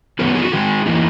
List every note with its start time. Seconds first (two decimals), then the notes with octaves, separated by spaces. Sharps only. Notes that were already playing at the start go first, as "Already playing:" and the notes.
0.19 D#3 F#3 B3 D#4 A#4
0.27 B4
0.35 G#4
0.44 F#4
0.52 D#3 G#3 D#4 G#4
0.86 E3 A#3 D#4